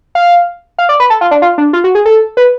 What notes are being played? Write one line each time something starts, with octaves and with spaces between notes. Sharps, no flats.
F5
F5
D5
B4
A4
F4
D4
F4
D4
F4
F#4
G#4
A4
B4